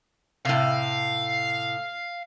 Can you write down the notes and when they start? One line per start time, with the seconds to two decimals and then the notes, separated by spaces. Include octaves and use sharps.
0.45 A2 C3 F5